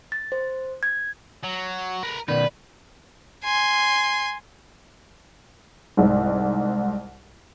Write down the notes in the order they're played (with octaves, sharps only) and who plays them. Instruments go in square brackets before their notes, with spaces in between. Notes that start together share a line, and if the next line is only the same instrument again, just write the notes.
[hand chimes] A6
C5
G#6
[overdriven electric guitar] F#3
A#4 B4
[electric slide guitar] B2 D#3 [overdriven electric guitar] B4 [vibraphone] D5
[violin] G#5 C6
[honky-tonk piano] C2 G#2